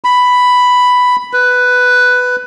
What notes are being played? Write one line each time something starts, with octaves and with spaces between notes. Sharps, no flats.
B5
B4